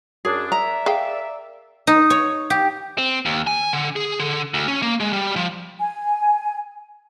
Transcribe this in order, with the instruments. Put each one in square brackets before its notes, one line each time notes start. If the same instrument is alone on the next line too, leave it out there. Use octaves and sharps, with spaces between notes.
[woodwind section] F#2 D4 [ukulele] G#4
[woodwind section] A#4 D5 E5 [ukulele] A#5
[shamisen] G#4 F5 G5
[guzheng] D#4
C#5
G4
[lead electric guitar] C4
D#2
G#5
D3
G#4
D3
D2
C#4
A#3
G#3
G3
F3
[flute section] G#5